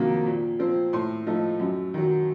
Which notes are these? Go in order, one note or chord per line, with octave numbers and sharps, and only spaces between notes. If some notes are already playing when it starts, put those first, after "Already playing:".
Already playing: F2 C3 D#3 F#3 A#3
A#2
F3 C4
A2 C6
F3 A3 D#4
F#2
D#3 F#3